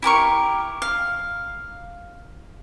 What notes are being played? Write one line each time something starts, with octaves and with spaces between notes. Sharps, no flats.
E4 G4 A#4 C#6
F5